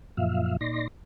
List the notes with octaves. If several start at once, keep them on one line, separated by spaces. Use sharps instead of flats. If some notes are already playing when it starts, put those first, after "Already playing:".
F#2 A#2 F3 E5 F5
A#2 D#4 D5 C6 A#6